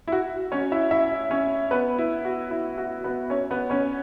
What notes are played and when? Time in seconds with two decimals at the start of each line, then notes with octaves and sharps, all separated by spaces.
0.07 E4
0.12 F#4
0.52 C#4 C#5
0.72 E4 E5
0.91 E4 E5
1.31 C#4 C#5
1.71 B3 B4
1.98 E4
2.25 F#4
2.51 E4
2.78 F#4
3.04 B3 B4
3.30 C#4 C#5
3.51 B3 B4
3.70 C#4 C#5